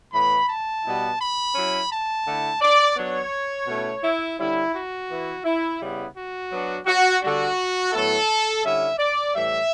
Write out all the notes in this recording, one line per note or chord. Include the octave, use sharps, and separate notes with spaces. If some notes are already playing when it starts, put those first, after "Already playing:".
A2 E3 B3 B5
A5
B2 G3 B3 E4
B5
F#3 C#4 E4
A5
D3 A3 E4
D5
F#3 B3 D4 C#5
B2 A3 C#4 E4
E4
D3 G3 C#4 E4
F#4
E3 B3 E4
E4
C#3 G3 B3 E4
F#4
F#3 B3 D4
F#4
D3 G3 D4 F#4
A2 F#3 B3 E4 A4
D3 G3 C#4 E4 E5
D5
A2 E3 G3 E5